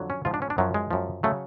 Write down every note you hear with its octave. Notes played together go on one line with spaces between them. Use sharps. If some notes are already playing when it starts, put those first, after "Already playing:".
Already playing: F2 D3 F#3
C#4
G#2 F3 F4
D4
C#4
D4
F#2 F3 F#3
G#3
F#2 F3
C#3 F#3 A3